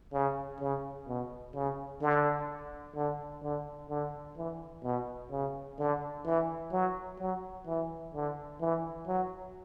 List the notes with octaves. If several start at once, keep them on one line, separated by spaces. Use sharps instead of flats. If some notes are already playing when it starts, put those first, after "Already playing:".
C#3
C#3
B2
C#3
D3
D3
D3
D3
E3
B2
C#3
D3
E3
F#3
F#3
E3
D3
E3
F#3